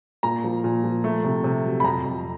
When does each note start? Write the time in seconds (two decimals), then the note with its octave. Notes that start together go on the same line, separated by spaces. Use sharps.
0.23 A#2 A#5
0.44 F3
0.64 A#2
0.84 F3
1.04 A3
1.24 C3
1.44 C3
1.64 F#3
1.80 B5
1.84 F2 A#5
2.05 F2